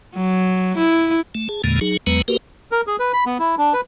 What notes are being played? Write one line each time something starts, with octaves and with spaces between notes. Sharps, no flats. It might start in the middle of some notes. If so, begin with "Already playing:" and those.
F#3
E4
A3
G#4 A5
E2 A#2 D3 G#3 A#3
F#3 D#4 G#4
E2 F#3 G#3 B3 B4 A#5
A#3 F#4 G4 A#4 B4
A#4
G#4
B4
B5
B3
E4
D4
B4